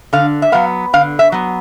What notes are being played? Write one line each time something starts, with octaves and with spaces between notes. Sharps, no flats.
D3 F5
E5
F#3 B3 F5
D3 F5
E5
F#3 B3